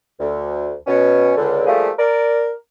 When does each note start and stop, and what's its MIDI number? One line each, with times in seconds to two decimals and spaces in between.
0.19 0.73 38
0.87 1.33 47
0.87 1.33 61
1.37 1.64 37
1.37 1.64 50
1.66 1.89 53
1.66 1.89 55
1.66 1.89 57
1.66 1.89 58
1.66 1.89 67
1.66 1.89 68
1.98 2.50 70
1.98 2.50 74